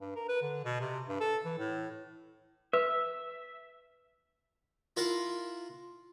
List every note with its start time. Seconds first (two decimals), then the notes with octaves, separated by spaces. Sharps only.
0.01 G2
0.15 A#4
0.29 B4
0.42 D3
0.64 B2
0.81 C3
1.08 G2
1.20 A4
1.45 E3
1.58 A2
2.73 B4 E5
4.97 E4 F4 A#4 F5 F#5